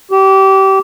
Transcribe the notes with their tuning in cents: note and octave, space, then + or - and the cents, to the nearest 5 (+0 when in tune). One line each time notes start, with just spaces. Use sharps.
G4 -25